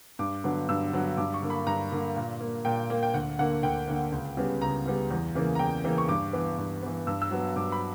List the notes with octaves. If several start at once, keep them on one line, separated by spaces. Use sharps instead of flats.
G2 D6
D3 F#3 B3
G2 E6
D3 F#3 B3
G2 D6
C#6
D3 A#3
B5
G2 A#5
D3 A#3
A#2
A#3
A#2 G5
A#3
G5
D2 F#5
D3 A#3 F#5
D2 G5
D3 A#3
C#2
C#3 G3 B3
C#2 A#5
C#3 G3 B3
E2
C#3 E3 A#3
A#5
E2 G5
C#3 E3 A#3
C#6
G2 D6
E3 B3
G2
E3 B3
G2 E6
E6
F#3 B3
G2 D6
B5